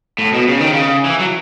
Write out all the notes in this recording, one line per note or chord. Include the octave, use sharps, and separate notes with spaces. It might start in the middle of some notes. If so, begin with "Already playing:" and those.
A2
B2
C#3
D#3
C#3
E3
F#3